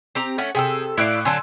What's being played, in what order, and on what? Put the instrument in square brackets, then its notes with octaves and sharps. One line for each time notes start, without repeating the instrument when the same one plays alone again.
[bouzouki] C4 G4 A#5
A3 C#4 F#5
[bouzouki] C3 A4 [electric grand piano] G#4 G5 E6
[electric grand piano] A2 F#6 D7 [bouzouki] E4 D5 F5
[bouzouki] D3 F#3 A5 [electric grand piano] G#5 C6 E6